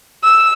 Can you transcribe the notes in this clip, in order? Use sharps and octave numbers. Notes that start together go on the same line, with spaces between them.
E6